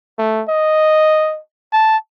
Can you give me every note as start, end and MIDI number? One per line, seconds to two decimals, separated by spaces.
0.18 0.43 57
0.48 1.40 75
1.73 1.97 81